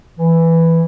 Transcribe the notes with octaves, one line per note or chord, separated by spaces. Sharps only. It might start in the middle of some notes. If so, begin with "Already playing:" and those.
E3